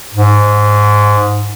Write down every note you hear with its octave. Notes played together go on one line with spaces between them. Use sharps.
G#2